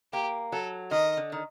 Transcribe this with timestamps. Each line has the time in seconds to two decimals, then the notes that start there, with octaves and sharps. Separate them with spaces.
0.13 A#3 G4
0.52 F#3 A4
0.91 D#3 D#5
1.17 D3
1.32 D#3